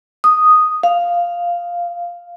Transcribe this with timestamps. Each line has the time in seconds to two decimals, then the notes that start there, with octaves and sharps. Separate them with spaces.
0.24 D#6
0.83 F5